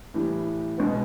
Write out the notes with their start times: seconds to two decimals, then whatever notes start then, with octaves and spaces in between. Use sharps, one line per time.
0.14 A2 E3 G3
0.78 B2 G#3 B3